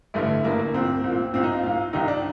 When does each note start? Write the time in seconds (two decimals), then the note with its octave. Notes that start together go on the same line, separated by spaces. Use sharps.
0.14 A1 G2 D3 A3
0.44 A1 G2 D3 A#3
0.59 A#3
0.74 C2 A#2 C4
1.04 C2
1.09 A#2
1.33 C2 A#2 C4
1.43 D#4
1.53 F4
1.63 C2 A#2 F4
1.93 C2 C3 D#3 D#4
2.08 D4